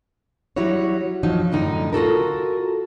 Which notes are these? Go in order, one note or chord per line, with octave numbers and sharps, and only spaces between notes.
F#3 G3 E4 F#4 C#5
F3 F#3 D#4
F#2 A2 D3 D#4
F4 F#4 A4 A#4